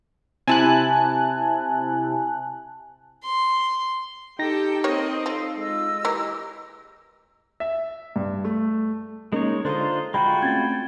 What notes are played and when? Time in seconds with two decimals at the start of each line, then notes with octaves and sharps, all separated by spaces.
0.48 C3 E4 G#5 A5 F#6
3.25 C6
4.39 D#4 G4 A4 G5 A#6
4.84 A#3 C4 G4 C#5 D#5
5.26 F3 A4 F5 E6
5.58 G#3 F4 D#5 E6
6.05 E3 A#3 G4 A#4
7.60 E5
8.16 G2
8.44 A3
9.32 G#3 A#3 C#4 D#4 A#4 C#5
9.65 D3 D4 F4 A4 C5 D#5 A#5
10.14 G#3 F4 F#4 G5 A#5 B5
10.42 A3 C4 C#4 G#6 A6